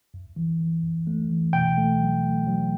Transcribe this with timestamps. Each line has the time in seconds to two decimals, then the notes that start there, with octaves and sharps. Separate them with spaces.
0.14 F#2
0.36 E3
0.60 E3
0.83 F#2
1.07 A3
1.30 E3
1.53 B2 G5
1.77 A3
2.00 F#3
2.23 A3
2.47 F#3